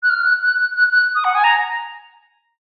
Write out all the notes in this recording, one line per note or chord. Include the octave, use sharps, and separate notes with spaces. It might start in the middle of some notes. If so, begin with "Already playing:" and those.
F#6
F6
F#6
F#6
F#6
F#6
F#6
D#6
F#5
G#5
A#5